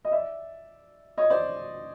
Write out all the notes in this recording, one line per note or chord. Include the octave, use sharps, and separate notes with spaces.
D#5
D5 E5
C#5 D#5
C5 D5